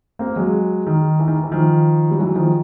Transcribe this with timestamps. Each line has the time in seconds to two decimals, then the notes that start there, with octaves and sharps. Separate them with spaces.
0.19 A#3 C4
0.36 F#3 G#3
0.86 D#3
1.20 E3
1.28 D#3
1.44 E3
1.52 D#3 F3
2.11 G3
2.19 E3 F#3
2.35 D#3 F3